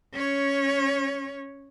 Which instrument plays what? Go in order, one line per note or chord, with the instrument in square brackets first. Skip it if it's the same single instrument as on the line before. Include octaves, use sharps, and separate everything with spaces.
[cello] C#4 C#5